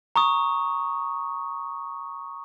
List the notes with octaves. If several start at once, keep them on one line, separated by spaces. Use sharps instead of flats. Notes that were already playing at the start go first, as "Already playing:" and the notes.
A#5 C#6 D#6